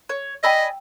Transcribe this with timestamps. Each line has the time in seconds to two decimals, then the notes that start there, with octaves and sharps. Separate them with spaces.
0.09 C#5
0.44 D5 D#5 G5 G#5 B5 E6